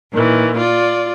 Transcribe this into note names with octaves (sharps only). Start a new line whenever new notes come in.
A#2 D#3 E3
F4 D5